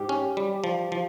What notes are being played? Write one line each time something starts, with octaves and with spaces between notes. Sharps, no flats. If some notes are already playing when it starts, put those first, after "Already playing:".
Already playing: G#2 G4
C#4
G3
F3
F3